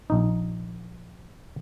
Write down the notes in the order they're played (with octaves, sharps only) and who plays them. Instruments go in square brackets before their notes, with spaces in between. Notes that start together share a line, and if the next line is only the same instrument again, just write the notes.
[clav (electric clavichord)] A#1 D#4